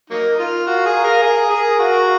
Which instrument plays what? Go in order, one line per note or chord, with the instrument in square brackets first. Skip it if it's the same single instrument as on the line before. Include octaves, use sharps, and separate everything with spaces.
[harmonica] F#3 A#3 D#4 [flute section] A#4
[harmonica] F4 [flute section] A#4
[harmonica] F#4 [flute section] F5
[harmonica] G#4
[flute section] A#5
[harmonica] A#4
[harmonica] G#4 [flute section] A#4
[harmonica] G#4 [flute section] A#4
[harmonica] F#4 [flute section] F5